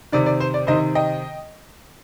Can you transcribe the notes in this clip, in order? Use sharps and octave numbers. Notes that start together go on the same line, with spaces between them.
C3 D#3 D5
D5
C5
D5
C3 D#3 C5 D#5
D#5 G5